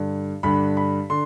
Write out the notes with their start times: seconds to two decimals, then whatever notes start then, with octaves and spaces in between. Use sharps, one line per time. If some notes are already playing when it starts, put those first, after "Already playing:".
Already playing: G2 D3
0.43 G2 D3 B5
0.77 B5
1.10 D3 C6